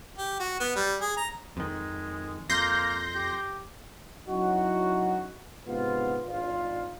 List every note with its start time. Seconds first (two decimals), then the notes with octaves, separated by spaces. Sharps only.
0.18 G4
0.40 F#4
0.60 B3
0.76 G3
1.01 G#4
1.17 A#5
1.57 F2 D#3 G#3
2.50 F2 A#3 C6 G6 A#6
3.16 G4
4.28 F#3 C#4 D#4 E4 F#4
5.66 G#2 C3 B3 D4 F4
6.23 G#1 D4 F4